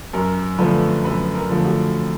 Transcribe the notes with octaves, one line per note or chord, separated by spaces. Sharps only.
F#2 A#4
D3 F3 A3 B4
F#2 B4
A#4
D3 F3 A3
F#4